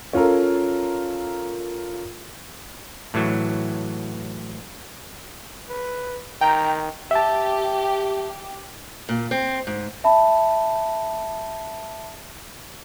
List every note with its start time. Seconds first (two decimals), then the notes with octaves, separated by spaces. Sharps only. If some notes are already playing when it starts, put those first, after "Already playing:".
0.13 C#4 F4 A4 A#4
3.14 A2 E3 F#3
5.69 B4
6.41 D#3 G5 A#5
7.11 G4 E5 A5
9.09 A#2
9.31 C4
9.67 G#2
10.04 E5 A5 B5